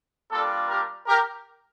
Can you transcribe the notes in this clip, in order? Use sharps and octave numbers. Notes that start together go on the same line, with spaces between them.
G3 A#3 D4 F4 A4
G4 A#4
G4 A#4